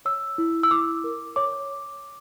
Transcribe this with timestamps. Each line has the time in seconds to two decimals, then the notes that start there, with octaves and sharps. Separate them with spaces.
0.05 C#5 E6
0.38 E4
0.63 E6
0.71 E4 D6
1.04 A#4
1.36 C#5 D6